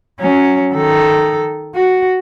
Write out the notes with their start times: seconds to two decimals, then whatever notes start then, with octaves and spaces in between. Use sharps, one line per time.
0.19 F#3 C#4
0.74 D#3 A4
1.75 F#4